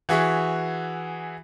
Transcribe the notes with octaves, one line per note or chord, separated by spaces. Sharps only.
E3 F#4 G#4 E5 C#6